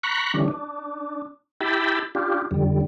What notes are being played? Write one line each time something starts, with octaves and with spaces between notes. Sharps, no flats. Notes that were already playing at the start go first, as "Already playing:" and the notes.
A#5 B5 C#6 F#6
D3 E3 G3 C#4 D4
D4
E4 G4 G5 A5 B5
D4 F4 G4
F2 D3 G3